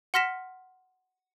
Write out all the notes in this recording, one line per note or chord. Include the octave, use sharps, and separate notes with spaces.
F#5 C6 F6 A#6 B6 E7